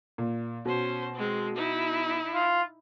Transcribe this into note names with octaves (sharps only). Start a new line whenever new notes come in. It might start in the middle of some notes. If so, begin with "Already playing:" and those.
A#2
B2 C#4 C5
G#3 C4
D#4 E4
F4